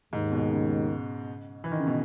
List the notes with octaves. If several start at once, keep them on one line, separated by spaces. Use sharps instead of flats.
D#2 G#2 D#3 G#3
B2
C#3
E3
D#3
C#3
B2